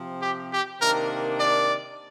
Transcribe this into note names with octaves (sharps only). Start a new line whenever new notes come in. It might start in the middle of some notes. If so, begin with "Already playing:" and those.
Already playing: C3 F3 C4
G4
G4
C3 D#3 A#3 D4 A#4
D5